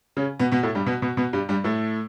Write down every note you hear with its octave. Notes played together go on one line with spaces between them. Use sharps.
C#3 C#4
B2 B3
B2 B3
A2 A3
G2 G3
B2 B3
B2 B3
B2 B3
G2 G3
G2 G3
A2 A3